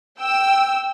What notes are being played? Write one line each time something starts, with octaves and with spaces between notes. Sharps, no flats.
G5 E6